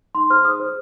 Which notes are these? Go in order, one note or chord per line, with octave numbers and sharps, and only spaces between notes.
D#4 C6
G#4 C5 F6
D#4 D#6
G#4 C5